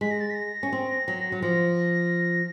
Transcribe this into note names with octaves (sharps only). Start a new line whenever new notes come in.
G#3 B6
A#6
A6
B6
A#6
C#4
C4
F#3
F#3
F3 A#6